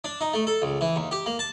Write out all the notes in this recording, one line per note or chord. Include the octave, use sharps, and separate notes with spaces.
D4
D#4
A3
A4
C#2
E3
D#2
G4
A#3
A5